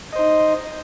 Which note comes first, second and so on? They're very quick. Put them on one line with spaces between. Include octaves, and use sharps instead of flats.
D#5 C5 D#4